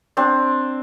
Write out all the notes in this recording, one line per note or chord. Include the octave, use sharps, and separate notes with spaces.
C4 D4